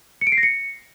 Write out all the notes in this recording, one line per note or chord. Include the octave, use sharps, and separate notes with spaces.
C#7
D7
C7
A#6
C#7